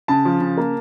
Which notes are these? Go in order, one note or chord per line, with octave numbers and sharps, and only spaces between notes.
C#3 A5
F3
C#3
A#3